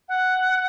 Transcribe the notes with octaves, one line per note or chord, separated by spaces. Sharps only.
F#5